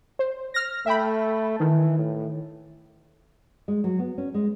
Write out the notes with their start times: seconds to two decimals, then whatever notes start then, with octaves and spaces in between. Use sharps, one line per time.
0.19 C5
0.54 F6 A#6
0.86 A3 E5 G5 B5
1.60 D#3 E3
1.98 A2
3.68 G#3
3.84 F#3
3.99 B3
4.18 C#4
4.34 G#3